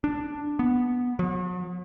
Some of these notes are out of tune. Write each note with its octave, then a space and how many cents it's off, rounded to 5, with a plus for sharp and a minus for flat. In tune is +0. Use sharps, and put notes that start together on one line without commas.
D4 +5
B3 -5
F#3 -45